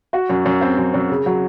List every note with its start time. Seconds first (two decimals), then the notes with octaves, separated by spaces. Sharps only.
0.13 F#4
0.29 F#2
0.45 F#2
0.61 C4
0.78 F#2
0.94 F#2
1.10 C#3
1.26 F#3